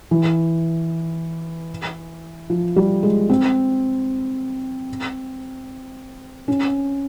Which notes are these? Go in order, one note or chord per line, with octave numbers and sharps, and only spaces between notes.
E3
F3
G3
G#3
C4
C#4